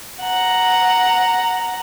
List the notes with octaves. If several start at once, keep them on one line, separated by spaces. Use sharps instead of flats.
F#5 A#5